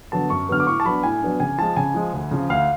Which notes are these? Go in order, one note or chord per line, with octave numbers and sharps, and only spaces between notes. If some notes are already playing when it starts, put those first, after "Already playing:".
D3 F#3 B3 A5
F#2 C#6
D3 F#3 B3 F6
D6
A2 C#6
A5
F#3 B3 D4 B5
A2 G#5
F#3 B3 D4
C#3 G#5
F3 G#3 A5
C#3 G#5
F3 G#3
D2
C#3 F3
D2 F5